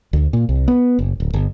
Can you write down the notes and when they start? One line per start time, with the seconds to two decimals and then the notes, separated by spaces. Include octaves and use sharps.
0.13 D2
0.33 A#2
0.49 C2
0.68 B3
0.99 F#1
1.20 D1
1.34 G1